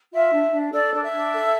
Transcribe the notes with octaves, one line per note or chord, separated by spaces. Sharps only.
F4 E5
D4
D4
A4 D5
D4
E5
D4
A4